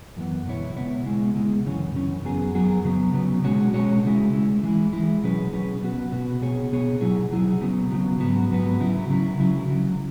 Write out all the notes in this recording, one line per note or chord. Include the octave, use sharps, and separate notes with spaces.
F#2 E3 B3
C#2 B2 B3 E4 C#5
C#2 B2 B3 E4 C#5
C#2 B2 G#3 E4
C#2 B2 G#3 E4
F#2 C#3 E3 C#4
F#2 C#3 E3 C#4
F#2 F#3 B3 G#4
F#2 F#3 B3 G#4
C#3 F#3 B3
C#3 F#3 B3
B2 G#3 C#4 F#4 C#5
B2 G#3 C#4 F#4 C#5
C#2 C#3 G#3 E4
C#2 C#3 G#3 E4
E3 G#3 E4
E3 G#3 E4
B2 F#3 C#4 G#4 B4
B2 F#3 C#4 G#4 B4
B2 B3 F#4 B4
B2 B3 F#4 B4
B2 B3 G#4 C#5
B2 B3 G#4 C#5
B2 F#3 E4 G#4
B2 F#3 E4 G#4
C#3 F#3 B3
C#3 F#3 B3
G#2 F#3 B3 F#4 B4
G#2 F#3 B3 F#4 B4
C#3 F#3 E4
C#3 F#3 E4
C#2 C#3 F#3 E4
C#2 C#3 F#3 E4